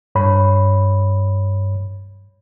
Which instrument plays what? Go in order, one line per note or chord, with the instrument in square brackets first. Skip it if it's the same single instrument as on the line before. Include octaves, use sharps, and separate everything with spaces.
[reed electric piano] G2 C#5 B5